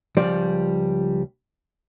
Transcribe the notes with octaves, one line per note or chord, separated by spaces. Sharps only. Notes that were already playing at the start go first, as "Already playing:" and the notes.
C#2 F3 G3 D5